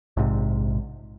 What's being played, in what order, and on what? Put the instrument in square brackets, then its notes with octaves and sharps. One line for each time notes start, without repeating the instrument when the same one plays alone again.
[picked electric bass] A#1 G#2 C3